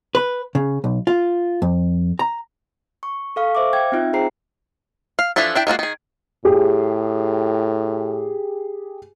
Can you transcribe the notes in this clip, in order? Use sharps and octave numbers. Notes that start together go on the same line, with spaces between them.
B4
C#3
B1
F4
F2
A#5
C#6
A4 F5 C#6
C5 E5 F5 D6
G5 G#6
C4 D#4 F4 E5
G#4 C5 G5 A#5 C7
F5
E3 F3 D4 E4 A4
D4 E4 G5
G#3 A#3 F4 F#4
D#3 G#4
A2 G4 G#4